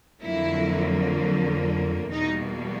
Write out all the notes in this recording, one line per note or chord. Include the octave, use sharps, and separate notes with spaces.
F2 D3 F#3 A#3 E4
E2 B2 G3 A#3 D#4